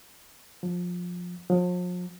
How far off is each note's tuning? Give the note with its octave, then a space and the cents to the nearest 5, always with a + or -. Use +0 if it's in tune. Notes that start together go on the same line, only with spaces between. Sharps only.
F3 +20
F3 +40